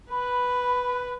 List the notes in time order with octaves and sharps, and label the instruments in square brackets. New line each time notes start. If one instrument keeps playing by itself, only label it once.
[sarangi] B4 [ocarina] B5